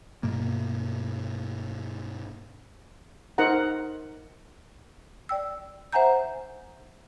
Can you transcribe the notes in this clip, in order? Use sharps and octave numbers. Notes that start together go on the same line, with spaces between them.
G2 B2 A#3
D#4 A#4 C5 F#5 A#5
D5 G5 E6
C5 E5 F#5 G#5 A#5 G6